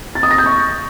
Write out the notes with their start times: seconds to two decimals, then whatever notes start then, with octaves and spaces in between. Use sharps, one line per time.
0.15 A6
0.23 D#6
0.31 A#6
0.38 G6
0.46 C#6